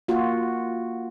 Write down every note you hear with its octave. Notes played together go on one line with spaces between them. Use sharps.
A#3 F4 F#4